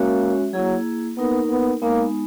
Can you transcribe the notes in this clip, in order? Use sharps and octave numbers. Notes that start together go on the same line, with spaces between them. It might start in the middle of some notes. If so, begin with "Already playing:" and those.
Already playing: G#3 A#3 C#4 F#4 C#5 E5
F#3 A#3 E4 G#4
A#3 B3 D#4 A#4
B3
G#3 A#3 B3 D#4